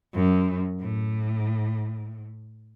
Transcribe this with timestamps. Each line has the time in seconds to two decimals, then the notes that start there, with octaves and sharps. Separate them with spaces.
0.14 F#2
0.80 A2